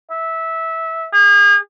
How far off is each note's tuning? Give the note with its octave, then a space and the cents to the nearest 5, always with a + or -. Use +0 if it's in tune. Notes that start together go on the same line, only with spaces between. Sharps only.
E5 -15
G#4 -40